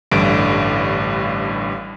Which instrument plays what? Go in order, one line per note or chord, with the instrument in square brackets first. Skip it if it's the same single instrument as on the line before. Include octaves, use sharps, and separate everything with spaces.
[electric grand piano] A1 G2 D3 D7